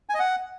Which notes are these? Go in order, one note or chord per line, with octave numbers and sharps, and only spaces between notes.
G#5
D#5
F#5